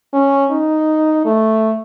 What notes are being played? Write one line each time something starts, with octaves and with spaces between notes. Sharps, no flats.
C#4
D#4
A3